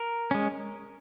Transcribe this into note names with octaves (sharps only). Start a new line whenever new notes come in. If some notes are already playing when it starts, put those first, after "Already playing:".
Already playing: A#4
G#3 C#4